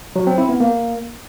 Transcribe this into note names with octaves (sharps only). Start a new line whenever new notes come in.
F#3
C4
E4
B3
A#3